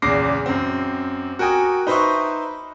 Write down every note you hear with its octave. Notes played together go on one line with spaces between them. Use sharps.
E2 A#2 C#3 D6 A#6 C7
F#2 C4
F#4 A#4 G5 G#5 D#6
D#4 B4 C5 D#5 E5 C#6